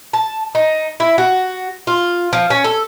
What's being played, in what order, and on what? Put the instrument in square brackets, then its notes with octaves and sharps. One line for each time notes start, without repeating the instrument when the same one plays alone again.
[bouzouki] A5
D#4
E4
F#4
F4
F3
C#4
A4